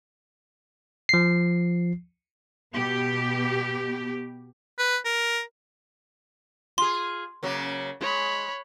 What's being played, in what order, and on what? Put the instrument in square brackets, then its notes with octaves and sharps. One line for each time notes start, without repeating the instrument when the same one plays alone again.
[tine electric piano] F3 C7
[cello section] B2 B3 G4
[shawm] B4
A#4
[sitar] F4 G#4 [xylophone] C6
[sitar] C#3 F#3 A#3
[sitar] G#3 [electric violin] C#5 B5